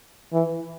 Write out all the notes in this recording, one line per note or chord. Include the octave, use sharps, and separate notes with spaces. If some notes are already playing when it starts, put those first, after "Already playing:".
E3